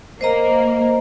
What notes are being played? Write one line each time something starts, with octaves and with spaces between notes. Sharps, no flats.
A#3 C5 D#5 A#5